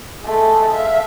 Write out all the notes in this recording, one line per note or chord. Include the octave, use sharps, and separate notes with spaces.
G#3 A3
E5 F5